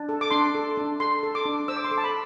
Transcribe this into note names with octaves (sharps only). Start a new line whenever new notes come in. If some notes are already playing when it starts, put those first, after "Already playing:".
Already playing: D4
A4
D6
D4 C6
A4
D4
A4 C6
A4
D6
D4
C5 E6
D6
C6
A4 D6
A5
B5